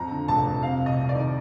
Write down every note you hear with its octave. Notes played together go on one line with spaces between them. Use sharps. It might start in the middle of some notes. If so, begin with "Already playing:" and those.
Already playing: F2 A#5
D3
F1 A5
F2
C3 F5
C2
D#5
C2
D5
D#3